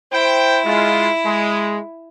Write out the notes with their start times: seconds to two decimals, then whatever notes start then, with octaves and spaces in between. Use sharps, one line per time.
0.12 E4 C5 G5
0.65 G#3 F4
1.24 G#3